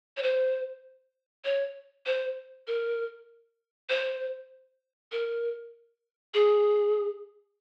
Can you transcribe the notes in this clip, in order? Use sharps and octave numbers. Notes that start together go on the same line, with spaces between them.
C#5
C5
C#5
C5
A#4
C5
A#4
G#4